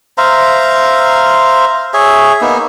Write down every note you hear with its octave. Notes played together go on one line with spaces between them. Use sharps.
C5 E5 F5 A#5
G#4 C#5 E5
A#3 B3 D#4